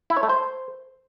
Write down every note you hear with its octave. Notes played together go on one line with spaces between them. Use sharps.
E4
C#5
A3
C5